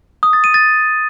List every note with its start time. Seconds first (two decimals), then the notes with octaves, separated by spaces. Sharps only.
0.23 D#6
0.33 A6
0.44 D#7
0.54 A6